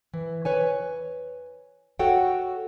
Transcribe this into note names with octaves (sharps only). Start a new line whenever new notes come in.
E3
B4 C#5 G#5
F#4 A4 C#5 F#5 G5